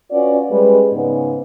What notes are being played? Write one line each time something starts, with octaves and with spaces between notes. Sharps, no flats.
C#4 F4 F#4 B4 D5
G3 G#3 C#4 G#4 B4
G#2 C#3 G#3 B3